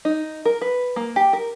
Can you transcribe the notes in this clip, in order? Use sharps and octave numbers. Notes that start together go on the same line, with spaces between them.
D#4
A#4
B4
A#3
G4
A#4